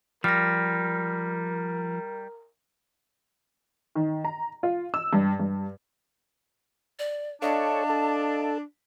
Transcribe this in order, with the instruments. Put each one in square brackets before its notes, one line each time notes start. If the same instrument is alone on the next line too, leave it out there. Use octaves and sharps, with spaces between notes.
[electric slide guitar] F3 [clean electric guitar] G3 [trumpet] A#4 [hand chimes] F6 A#6
[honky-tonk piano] D#3
A#5
F4
E6
G2
G2
[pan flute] D5
[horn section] D4 [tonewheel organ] A4 C#5 [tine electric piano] D#5 F5 [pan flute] A5
[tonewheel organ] A4